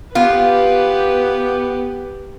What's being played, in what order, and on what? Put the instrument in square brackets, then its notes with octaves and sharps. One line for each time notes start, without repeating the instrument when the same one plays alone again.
[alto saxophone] B3 [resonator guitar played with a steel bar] F4 [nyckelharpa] G4 B4